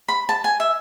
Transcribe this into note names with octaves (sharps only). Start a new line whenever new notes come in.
B5
A5
G#5
E5